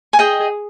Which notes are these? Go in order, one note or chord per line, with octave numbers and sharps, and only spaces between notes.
G#5
G#4 D#5 G5